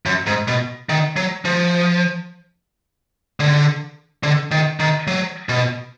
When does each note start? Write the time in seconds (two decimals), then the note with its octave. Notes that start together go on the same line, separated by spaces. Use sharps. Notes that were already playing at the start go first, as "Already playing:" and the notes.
0.06 F#2
0.26 G#2
0.48 B2
0.89 D#3
1.16 F#3
1.45 F3
3.40 D3
4.23 D3
4.51 D#3
4.80 D#3
5.07 F#3
5.49 B2